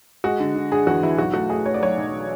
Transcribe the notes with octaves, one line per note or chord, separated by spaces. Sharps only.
G#3 F#4
D3
D3
D4 G#4
E2 F#4
E2 E4
B1 F#4
A3 F#4
A3 G#4
A3 C#5
D5
F#3 C#5
B1